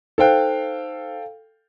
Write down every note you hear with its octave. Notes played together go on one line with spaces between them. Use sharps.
D#4 A4 C5 F5 G5 F#6